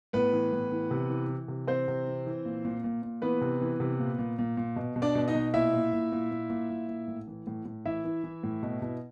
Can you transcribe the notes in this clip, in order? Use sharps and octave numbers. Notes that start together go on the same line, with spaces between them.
A2 B3 B4
E3
A2
E3
C3
E3
E3
C3
E3 C4 C5
C3
E3
E3
A#2
A#2
A#2
A#2
E3 B3 B4
C3
E3
C3
A#2
A#2
A#2
A#2
B2
B2
D4 D5
B2
D#4 D#5
B2
A#2 E4 E5
A#2
A#2
A#2
A#2
A#2
A#2
A#2
A2
E3
A2
A2
E3 E4 E5
E3
E3
A2
B2
B2